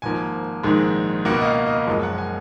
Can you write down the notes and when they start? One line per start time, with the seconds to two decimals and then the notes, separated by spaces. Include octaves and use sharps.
0.02 G#1 G#2 F3 A#3 G#5
0.63 A#1 G#2 D#3 G#3
1.25 C#2 B2 A#3 F#5
1.41 D#5
1.45 F5
1.67 D#5
1.87 F#1 F#2 F3 G#3 D#5
2.03 F#5
2.18 G#5